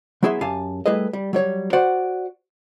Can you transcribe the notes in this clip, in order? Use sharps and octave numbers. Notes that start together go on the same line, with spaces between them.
F#3 B3 E4 G#4 E5 C6
F#2 G4 F5 G#5 A5
G3 A3 E4 G#4 B4 D#5
G3
F#3 G3 C#5
F#4 C5 D5 F#5